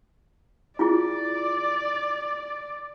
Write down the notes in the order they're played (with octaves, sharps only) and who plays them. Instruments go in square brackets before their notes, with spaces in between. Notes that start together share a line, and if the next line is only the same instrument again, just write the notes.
[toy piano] E4 F4 G#4 [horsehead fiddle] D5